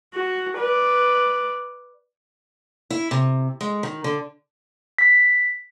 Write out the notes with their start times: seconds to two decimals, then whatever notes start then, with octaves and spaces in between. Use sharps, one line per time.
0.14 F#4
0.58 B4 D5
2.90 E4
3.11 C3
3.61 G#3
3.83 D#3
4.04 D3
4.98 B6